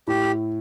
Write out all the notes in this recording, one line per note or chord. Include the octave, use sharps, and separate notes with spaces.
A2 G4